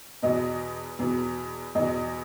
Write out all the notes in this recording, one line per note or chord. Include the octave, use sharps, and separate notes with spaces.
E2 B2 D#5
E2 B2
E2 B2 D#5